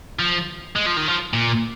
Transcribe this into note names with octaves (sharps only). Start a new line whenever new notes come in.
F3
G#3
F3
D#3
F3
A#2